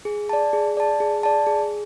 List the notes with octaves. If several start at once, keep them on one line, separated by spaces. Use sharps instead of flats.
G#4
D5 A5
G#4
D5 A5
G#4
D5 A5
G#4